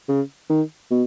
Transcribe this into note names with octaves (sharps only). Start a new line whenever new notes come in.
C#3
D#3
B2